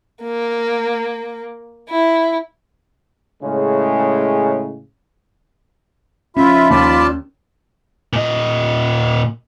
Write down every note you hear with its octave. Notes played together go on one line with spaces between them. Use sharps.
A#3
E4
A2 C#3 G#3 C#4
F3 C#4 D#4 F4 E5 B5
D#2 F4 D5 A5
A#2 D#5